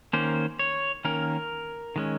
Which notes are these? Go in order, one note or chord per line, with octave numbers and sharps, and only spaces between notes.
D#3 A#3 C#4 C5
C#5
D#3 A#3 C#4 A#4
D#3 G#3 C#4